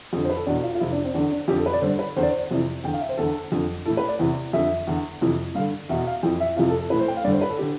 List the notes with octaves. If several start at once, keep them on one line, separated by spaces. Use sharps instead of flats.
F2 D3
C5
B4
A4
E2 B2 D4
F4
F4
F2 C3 E3 E4
D4
C4
E2 D3 D4
D4
F2 D3 G4
A4
B4
D5
G2 D3 C5
B4
E2 D3 C5
D5
C5
F2 C3 E3
E2 D3 G5
F5
E5
C5
E2 D3 A4
F2 D3
A2 E3 A4
B4
D5
E2 C3 E3
F2 D3 E5
E2 D3
F2 C3 E3
G2 D3 F5
E2 B2 E5
F5
F2 E3 G5
E5
F2 C3 E3 F4
A4
A4
A2 E3 B4
C5
G5
F5
G2 D3 D5
C5
B4
A4
D3 G4